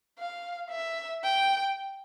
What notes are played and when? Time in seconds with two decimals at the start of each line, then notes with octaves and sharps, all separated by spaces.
0.19 F5
0.71 E5
1.24 G5